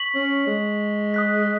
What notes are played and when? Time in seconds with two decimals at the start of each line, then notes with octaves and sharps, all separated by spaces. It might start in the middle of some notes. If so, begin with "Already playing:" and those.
Already playing: C#6 B6 F#7
0.15 C#4
0.47 G#3
1.14 D#6 F#6 B6